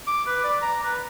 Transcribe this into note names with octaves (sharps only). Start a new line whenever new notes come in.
D6
B4
D5
A#5
B4